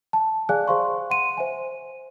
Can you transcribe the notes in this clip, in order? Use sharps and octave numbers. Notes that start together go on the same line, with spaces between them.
A5
G#4 D5 F5 G#5 F#6
G#4 C5 F5 C6 C#6
F#5 C6 D#7
C5 E5 G#5